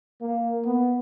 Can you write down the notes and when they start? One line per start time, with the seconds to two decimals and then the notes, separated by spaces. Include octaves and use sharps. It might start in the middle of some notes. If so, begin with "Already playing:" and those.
0.22 A#3
0.66 B3